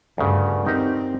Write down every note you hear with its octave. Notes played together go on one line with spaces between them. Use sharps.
D2 G2 C#3
C4 D#4 G4 A#4